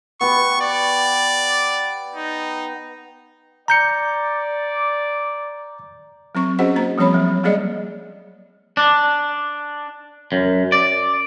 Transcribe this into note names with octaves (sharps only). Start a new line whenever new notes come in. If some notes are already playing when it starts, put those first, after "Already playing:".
B3 G4 C#6
D5
D#4
D5 A#5 G6 C#7
F#3 C4 C#6
C#4 F#4 G#4 C5 D#5 F#5
A#3 A#5
F3 G3 C4 C#5 B5
F#3
F#3 G3 A#3 G#4 D5 D#5
D4
F#2
D5